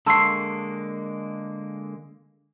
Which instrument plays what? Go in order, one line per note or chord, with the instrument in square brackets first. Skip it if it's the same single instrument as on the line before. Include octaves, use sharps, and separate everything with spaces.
[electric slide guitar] D3 G#3 A#3 [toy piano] A5 C6 C#6 [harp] E6 C7